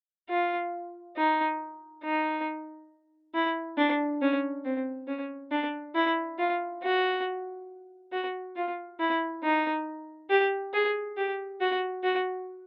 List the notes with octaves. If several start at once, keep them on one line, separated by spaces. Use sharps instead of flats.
F4
D#4
D#4
E4
D4
C#4
C4
C#4
D4
E4
F4
F#4
F#4
F4
E4
D#4
G4
G#4
G4
F#4
F#4